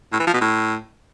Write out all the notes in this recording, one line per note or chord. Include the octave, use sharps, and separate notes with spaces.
A2
E3
F3
B2
A2